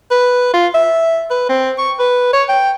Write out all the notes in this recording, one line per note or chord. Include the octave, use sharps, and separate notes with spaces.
B4
F4
E5
B4
C4
C#6
B4
C#5
G5